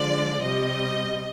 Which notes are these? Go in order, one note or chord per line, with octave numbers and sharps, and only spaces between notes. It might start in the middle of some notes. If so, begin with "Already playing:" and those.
Already playing: D3 F3 G#3 D5
C3 G3 D#5